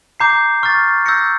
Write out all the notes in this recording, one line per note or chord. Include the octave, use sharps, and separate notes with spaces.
A#5 D6 G6 C7
C#6 F6 A6
E6 G6 A#6 C#7